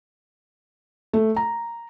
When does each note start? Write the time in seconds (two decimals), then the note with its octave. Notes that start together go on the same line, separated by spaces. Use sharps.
1.13 A3
1.36 A#5